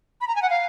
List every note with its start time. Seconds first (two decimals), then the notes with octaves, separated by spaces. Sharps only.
0.21 B5
0.28 A#5
0.36 G#5
0.42 F#5
0.50 F5